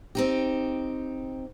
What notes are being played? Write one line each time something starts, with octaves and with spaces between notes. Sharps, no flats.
C4 D#4 G4